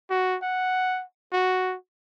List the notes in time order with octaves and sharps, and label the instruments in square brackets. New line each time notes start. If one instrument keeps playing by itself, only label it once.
[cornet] F#4
F#5
F#4